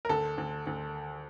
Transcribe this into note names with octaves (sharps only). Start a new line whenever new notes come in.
A#4
D2 A4
D2
D2